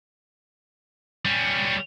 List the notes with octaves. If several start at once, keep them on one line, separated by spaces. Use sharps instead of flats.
G3 C#4